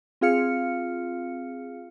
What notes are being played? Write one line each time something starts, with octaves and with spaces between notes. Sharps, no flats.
C4 F4 G#4 F5 F6 C#7